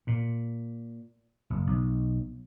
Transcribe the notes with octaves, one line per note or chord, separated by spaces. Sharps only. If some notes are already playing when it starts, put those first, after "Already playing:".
A#2
F#1
B1